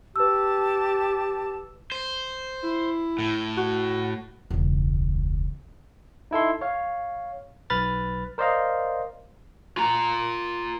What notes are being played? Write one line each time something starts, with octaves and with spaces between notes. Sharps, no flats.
G4 B4 A5 E6
C5
E4
A2
F#4
E1 C#2
D#4 E4 A4 C6
C#5 F5
B1 B4 B5 F6 A6
A#4 C5 D5 D#5 F5 A#5
F4 A#5